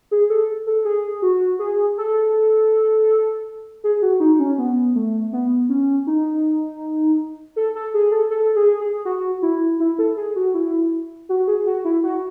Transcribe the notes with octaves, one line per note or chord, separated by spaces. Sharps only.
G#4
A4
A4
G#4
F#4
G#4
A4
G#4
F#4
D#4
C#4
B3
A3
B3
C#4
D#4
A4
A4
G#4
A4
A4
G#4
G#4
F#4
E4
E4
A4
G#4
F#4
E4
F#4
G#4
F#4
E4
F#4